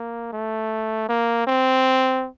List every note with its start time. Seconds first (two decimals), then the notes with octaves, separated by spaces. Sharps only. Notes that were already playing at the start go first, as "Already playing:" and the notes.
Already playing: A#3
0.33 A3
1.09 A#3
1.47 C4